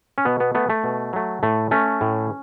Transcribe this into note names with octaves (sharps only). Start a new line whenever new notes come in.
C#4
B2 B3
B3
A3 B3
A3
B2
F#3 A3
A2 A3
A3 C#4
A2